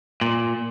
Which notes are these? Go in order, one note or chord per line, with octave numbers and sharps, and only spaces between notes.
A#2